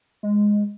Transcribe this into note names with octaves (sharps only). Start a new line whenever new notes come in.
G#3